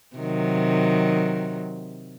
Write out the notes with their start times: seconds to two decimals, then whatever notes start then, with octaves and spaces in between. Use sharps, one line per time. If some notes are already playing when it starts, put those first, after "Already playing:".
0.16 C3 D#3 F#3